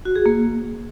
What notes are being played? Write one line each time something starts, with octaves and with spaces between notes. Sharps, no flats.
F#4
G#4
A#3